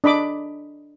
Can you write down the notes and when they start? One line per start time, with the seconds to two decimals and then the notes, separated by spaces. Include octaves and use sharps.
0.04 D4 D#5 B5 D6